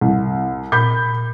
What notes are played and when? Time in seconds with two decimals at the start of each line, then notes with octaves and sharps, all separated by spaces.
0.01 C2
0.72 A#2 B5 G6